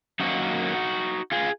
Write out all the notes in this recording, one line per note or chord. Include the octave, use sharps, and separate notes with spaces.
F#2 D#3 F#3 A#3 D#4 F#4
F4 G#4